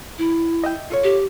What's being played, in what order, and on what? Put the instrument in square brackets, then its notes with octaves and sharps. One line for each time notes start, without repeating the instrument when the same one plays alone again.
[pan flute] E4
[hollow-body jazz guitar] D#5 E5 G5
F4 A4 C#5
[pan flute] G4